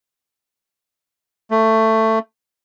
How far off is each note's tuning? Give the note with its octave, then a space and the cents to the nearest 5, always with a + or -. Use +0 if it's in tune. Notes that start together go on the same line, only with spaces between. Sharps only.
A3 +15